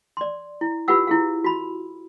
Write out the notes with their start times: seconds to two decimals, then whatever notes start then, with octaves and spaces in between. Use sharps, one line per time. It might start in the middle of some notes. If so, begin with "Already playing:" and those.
0.17 D5 C6
0.61 E4
0.88 F4 G4 B4 F#5 E6
1.07 E4 G#4 F5
1.44 F#4 B5